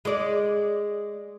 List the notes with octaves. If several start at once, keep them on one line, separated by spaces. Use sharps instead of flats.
G#3 D5